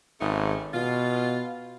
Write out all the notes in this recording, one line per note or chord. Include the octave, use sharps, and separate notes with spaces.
G#1 C#3 A3 D#4
B2 F4